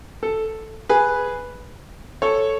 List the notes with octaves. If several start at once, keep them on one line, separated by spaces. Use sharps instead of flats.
A4
G#4 B4
A4 C#5